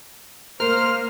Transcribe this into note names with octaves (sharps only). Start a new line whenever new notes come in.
A#3 A#4 C5 F6